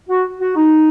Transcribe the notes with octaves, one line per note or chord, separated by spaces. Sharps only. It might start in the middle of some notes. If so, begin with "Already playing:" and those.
F#4
F#4
D#4